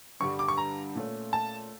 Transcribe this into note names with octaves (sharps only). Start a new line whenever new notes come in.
G2 D3 G3 C#6
D6
C#6
A#5
A#2 A3 C#4
A5